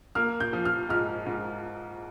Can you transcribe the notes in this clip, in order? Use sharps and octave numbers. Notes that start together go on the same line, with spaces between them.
A#3 F6
G6
F3
F6
G#2 F6
G#2